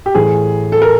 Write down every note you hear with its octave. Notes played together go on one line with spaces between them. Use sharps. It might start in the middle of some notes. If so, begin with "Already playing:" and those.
G4
A2 E3 G#4
A4
A#4